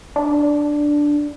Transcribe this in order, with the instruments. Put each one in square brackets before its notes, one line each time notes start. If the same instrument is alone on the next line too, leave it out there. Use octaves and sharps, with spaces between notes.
[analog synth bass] D4